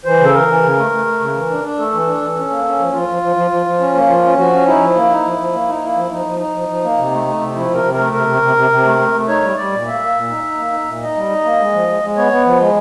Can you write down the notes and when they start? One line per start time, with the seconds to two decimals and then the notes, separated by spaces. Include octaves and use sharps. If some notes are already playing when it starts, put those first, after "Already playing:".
0.05 E3 C5
0.20 C#3 A4
0.34 E3 A#4
0.48 E3
0.63 C#3
0.77 A3
0.91 A3
1.07 A3
1.21 C#3
1.35 E3
1.50 D4
1.64 D4
1.78 A3 A4
1.93 E3
2.07 D4
2.22 E3
2.36 C#4
2.51 A#3
2.64 C#4
2.79 F3
2.93 F3 F4
3.08 F3
3.22 F3
3.36 F3
3.51 F3
3.66 F3
3.80 C#4
3.94 A#3
4.09 F3 F4
4.23 C#4
4.38 F3 F#4
4.52 C#4
4.67 D#4 E4
4.81 F3
4.95 A#3
5.10 D#4
5.25 F3
5.38 F3
5.53 A#3
5.68 D#4
5.82 A#3 E4
5.97 F3
6.11 F3 D#4
6.26 F3
6.39 D#4
6.54 F3
6.69 F3
6.83 A#3
6.98 C3
7.12 A3
7.26 A3
7.41 C3
7.55 F3 E4
7.70 C3
7.75 A#4
7.84 C3
7.94 A3 A#4
8.13 C3 A#4
8.28 C3
8.42 C3
8.56 C3
8.71 C3
8.85 A3
8.99 A3
9.15 A3
9.28 D#4 C#5
9.43 G3
9.57 G3 D5
9.72 A#2
9.86 A#3 E5
10.01 A#3
10.15 A#2
10.29 D#4
10.44 D#4
10.58 A#3
10.72 D#4
10.87 A#2
11.02 D#4 D#5
11.16 G3
11.30 D#4
11.44 A#3
11.59 G#3
11.73 F3
11.88 G#3
12.02 G#3
12.17 B3 C#5
12.32 B3
12.46 F3
12.60 G#3